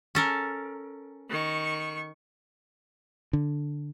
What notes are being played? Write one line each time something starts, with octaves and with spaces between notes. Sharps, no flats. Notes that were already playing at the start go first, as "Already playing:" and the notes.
C#4 A4 A#4
D#3 C#6
D3